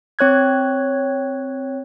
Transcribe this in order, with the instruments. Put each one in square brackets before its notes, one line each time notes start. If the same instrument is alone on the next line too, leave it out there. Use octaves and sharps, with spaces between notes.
[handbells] C4 C#5 F#6 G#6